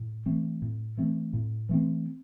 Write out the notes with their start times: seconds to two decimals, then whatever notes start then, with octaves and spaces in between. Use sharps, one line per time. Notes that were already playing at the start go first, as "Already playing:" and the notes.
Already playing: A2
0.26 E3 A3 C4
0.62 A2
0.97 E3 A3 C4
1.33 A2
1.69 E3 A3 C4